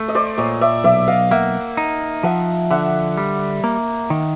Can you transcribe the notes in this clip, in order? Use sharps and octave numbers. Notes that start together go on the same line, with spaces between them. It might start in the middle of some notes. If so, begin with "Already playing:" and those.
Already playing: A3
D#5
C5 D5
A#2 C#5 D#5
D5 E5
B1 D5 E5
D#5 F5
A#3 E5 F#5
D#4
F3 E5 F#5
D3 E5 F#5
G3
A#3
D#3